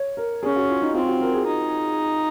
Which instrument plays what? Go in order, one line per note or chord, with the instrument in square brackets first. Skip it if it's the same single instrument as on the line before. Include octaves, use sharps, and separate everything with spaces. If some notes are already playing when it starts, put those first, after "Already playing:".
Already playing: [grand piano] C#5
A#4
[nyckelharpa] C#4 [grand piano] G#4
[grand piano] F#4
F4
D#4
[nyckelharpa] C4 [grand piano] F4
[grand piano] F#4
A#4
G#4
[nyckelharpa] D#4